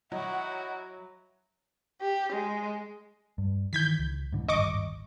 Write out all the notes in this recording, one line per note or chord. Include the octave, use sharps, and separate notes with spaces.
F#3 D#4 E4 F#4 F#5
G4
G#3
G2
D#3 E3 G6 G#6 B6
C#2
G#2 D3 E3
D1 G#1 G2 D#5 C#6 D6